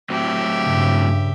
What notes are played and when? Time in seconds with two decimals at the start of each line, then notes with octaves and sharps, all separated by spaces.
0.10 A2 F#3 C4 G4 E5
0.65 G2 C#3